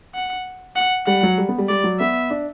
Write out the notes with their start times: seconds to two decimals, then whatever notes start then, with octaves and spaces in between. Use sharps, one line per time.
0.15 F#5
0.76 F#5
1.07 G3 F#5
1.23 F#3
1.38 G3
1.49 B3
1.58 G3
1.68 G3 D5
1.84 F#3
2.00 B3 E5
2.30 D4